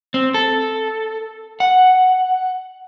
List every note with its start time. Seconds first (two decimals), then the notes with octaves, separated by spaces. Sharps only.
0.14 C4
0.34 A4
1.60 F#5